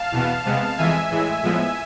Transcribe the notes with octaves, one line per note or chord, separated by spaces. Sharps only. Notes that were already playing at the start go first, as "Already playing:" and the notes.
Already playing: F5 A5
E2 B2 B3
C3 G#3 B3
F2 E3 G#3 E5 G#5
A2 E3 G#3
A2 F3 G#3 B3